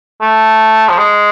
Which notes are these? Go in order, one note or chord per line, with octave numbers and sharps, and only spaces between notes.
A3
F3
G#3